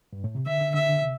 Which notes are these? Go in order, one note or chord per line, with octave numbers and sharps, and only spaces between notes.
G2
A2
C3
D3 E5
D3
D3 E5
D3
C3